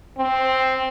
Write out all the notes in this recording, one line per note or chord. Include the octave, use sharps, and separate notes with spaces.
C4